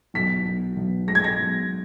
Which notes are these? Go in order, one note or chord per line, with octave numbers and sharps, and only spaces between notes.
B1 B6
B1
B1
G#3 A#6
G#6
A#6
B1